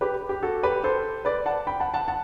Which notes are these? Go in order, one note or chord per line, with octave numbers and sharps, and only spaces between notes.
G4 B4
G4
F#4 A4
G4 B4
A4 C5
B4 D5
F#5 A5
G5 B5
F#5 A5
F#5 A5
F#5 A5